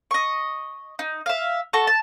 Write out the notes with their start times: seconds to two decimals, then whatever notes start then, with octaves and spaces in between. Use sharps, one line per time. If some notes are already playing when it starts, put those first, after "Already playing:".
0.11 D#5 C#6
0.99 D#4
1.26 E5 F5
1.73 F#4 A4 C#6
1.87 A5